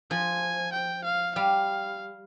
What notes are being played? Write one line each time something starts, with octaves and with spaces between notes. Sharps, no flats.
F3 G#5
G5
F5
G3 F5